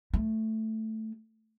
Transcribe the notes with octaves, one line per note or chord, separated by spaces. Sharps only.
A3